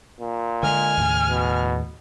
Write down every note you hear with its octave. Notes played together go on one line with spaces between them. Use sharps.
A#2
D3 G#3 G#5 F6
D#2 A2 C#3
B2